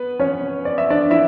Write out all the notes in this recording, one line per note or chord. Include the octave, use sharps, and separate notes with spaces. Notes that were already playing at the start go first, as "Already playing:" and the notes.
Already playing: B3 B4
C#4 C#5
D5
E5
D4 D5
E4 E5